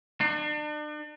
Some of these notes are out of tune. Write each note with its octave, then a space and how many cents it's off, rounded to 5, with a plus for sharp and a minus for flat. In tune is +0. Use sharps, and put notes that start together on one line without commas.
D4 +40